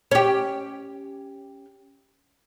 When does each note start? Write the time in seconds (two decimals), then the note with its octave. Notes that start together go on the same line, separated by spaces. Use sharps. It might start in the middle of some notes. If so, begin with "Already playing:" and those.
0.11 C#4 G4